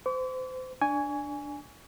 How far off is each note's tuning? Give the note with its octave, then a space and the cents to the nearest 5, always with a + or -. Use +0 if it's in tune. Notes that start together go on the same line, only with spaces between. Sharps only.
C5 -30 D6 -45
D4 +0 G#5 +0 C#6 +30